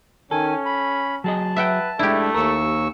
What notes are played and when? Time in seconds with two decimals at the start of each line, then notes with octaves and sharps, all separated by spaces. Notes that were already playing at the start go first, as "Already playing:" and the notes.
0.31 D#3 C#4 A4 G#5
0.65 B5
1.24 F#3 G#4 D#5 A5
1.56 B4 E5 F#5 G5
1.99 G#3 A3 D4 E4 G4
2.34 D#2 A#4 C#6 E6